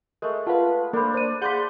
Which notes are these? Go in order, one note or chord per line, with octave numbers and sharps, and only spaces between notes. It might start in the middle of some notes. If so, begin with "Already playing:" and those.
G#3 A3 A#4
F4 B4 F5 F#5 A5
A#3 D4 A4 A#4 C5 B5
D4 C5 D5 D#7
G#4 B4 D5 F5 F#5 C6 G6 B6